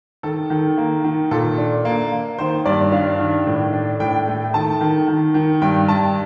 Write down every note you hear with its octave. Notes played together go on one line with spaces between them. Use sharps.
D#3 A4
D#3
A#3
D#3
A#2 A4
D4
A#3
A#3
D#3 C5
G2 D5
D4 F5
D#3
A2
D4
A2 G5
A3
D#3 A5
D#3
D#3
D#3
G2 G5
G2 A5